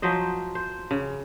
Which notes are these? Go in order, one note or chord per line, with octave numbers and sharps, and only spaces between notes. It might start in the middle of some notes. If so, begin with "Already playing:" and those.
F3 F#3 C5 D#5
C5
C#3